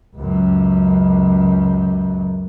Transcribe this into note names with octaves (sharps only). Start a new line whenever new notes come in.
C#2 F#2